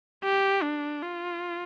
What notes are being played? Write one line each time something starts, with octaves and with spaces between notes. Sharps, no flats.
G4
D4
F4